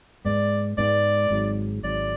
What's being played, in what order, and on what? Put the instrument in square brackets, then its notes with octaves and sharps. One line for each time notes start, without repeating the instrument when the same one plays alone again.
[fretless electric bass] G#2 G#3 B3 [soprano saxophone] D5
[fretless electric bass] G#2 G#3 B3 [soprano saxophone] D5
[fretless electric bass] G#1 G#2 F#3
[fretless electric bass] G#1 G#2 F#3 [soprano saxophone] D5